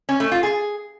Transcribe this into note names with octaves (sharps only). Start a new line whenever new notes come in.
C#4
A3
F4
G#4